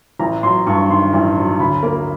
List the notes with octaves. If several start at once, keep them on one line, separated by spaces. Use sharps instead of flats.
A1 A#5
F#3 C6
G2 C#6
D#3 C6
A1
F#3
D2 B5
A#3